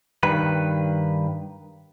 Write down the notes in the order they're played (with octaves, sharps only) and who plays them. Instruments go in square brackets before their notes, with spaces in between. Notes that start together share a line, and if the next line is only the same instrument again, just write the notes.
[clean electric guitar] G2 D#3 B4